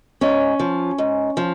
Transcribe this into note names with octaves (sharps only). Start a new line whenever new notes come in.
G#2 C#4
F3
G#2
F3